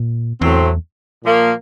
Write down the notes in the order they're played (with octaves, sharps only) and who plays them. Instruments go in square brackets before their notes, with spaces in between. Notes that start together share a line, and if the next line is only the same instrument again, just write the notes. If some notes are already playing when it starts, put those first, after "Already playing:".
Already playing: [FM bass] A#2
[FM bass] E2 [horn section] A2 F#3 A3 C4
[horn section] A#2 F3 A#3